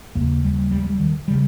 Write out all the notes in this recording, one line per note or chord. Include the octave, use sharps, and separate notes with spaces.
D#2 C#3 A#3
G3
G3
G3
D#3
C#3 G3